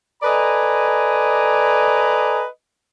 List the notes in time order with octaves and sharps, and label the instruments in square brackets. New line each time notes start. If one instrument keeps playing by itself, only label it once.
[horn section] A4 B4 D5 D#5 G#5 A#5